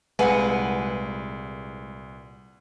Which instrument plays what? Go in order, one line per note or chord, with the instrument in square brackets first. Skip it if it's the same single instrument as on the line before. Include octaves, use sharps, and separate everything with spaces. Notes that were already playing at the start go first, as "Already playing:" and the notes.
[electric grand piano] C2 [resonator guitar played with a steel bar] A#2 F#5 G#5 [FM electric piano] G#3 [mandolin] B4